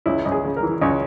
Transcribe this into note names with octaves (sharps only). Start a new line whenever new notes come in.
C#2 E4
C#2
G#4
C#3
A#4
E3
C#2 C#5